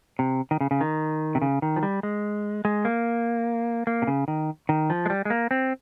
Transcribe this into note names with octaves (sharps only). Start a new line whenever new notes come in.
C3
D#3
C#3
C#3
D#3
C3
C#3
D#3
F3
G3
G#3
G#3
A#3
A#3
C3
C#3
D#3
D#3
F3
G#3
G3
G#3
A#3
C4